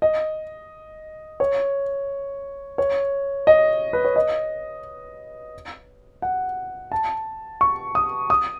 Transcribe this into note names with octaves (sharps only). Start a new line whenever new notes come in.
D#5
C#5
C#5
D#5
B4
C#5
D#5
F#5
A5
C#6
D#6
D#6